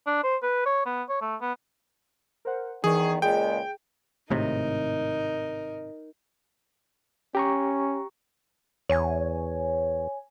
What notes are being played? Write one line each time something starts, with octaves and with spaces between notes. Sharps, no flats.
D4
C5
B4
C#5
B3
C#5
A3
B3
A#4 C5 F#5
E2 D#3 E3 G#4 C#6
C#2 A#2 G#3 G#4 G5
G#1 A2 C3 D#4 A#4
C#4 G4 A#5 C#6
E2 C#5 G#5